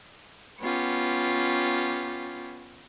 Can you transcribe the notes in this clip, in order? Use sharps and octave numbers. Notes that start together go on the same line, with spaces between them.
B3 C#4 F4 G4